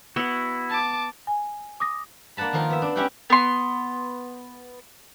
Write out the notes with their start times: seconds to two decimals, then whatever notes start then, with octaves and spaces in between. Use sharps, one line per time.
0.16 B3 E4 F#4 F#5
0.70 A5 D6
1.27 G#5
1.80 D6 D#6 A#6
2.37 A#3 D4 F#5 A5 B5
2.53 D#3 F3 A#3 F4
2.70 B3 E5
2.82 D4
2.96 C#4 E4 G4 F#5 G5
3.30 B3 C6